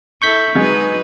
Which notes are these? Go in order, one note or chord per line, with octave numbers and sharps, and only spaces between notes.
E4 A4 C#6 G6 B6
F#3 G#3 D#4 B4